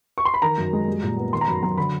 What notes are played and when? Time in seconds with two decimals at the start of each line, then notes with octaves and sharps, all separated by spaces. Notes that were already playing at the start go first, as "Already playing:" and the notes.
0.18 C#6
0.25 C6
0.34 B5
0.42 D#3 A#5
0.58 F#2
0.73 G#3
0.88 G3
1.03 A#2
1.17 B3
1.33 D#3 C6
1.41 A#5
1.47 F#2 B5
1.62 F#3 A#5
1.78 D3 B5